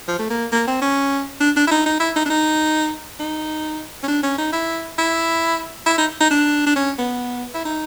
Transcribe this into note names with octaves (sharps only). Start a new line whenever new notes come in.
F3
A3
A#3
A#3
C4
C#4
D4
D4
E4
D#4
D#4
E4
D#4
D4
D#4
D#4
C#4
D4
C#4
D#4
E4
E4
E4
D#4
D#4
D4
D4
C#4
B3
E4
D#4